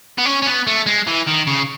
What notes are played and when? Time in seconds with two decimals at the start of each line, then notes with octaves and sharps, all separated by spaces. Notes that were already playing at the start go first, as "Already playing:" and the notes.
0.18 B3
0.26 C#4
0.42 C#4
0.47 B3
0.67 A3
0.86 G#3
1.07 E3
1.27 D#3
1.47 C#3